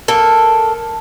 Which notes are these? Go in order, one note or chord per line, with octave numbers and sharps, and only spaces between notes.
A#3 A4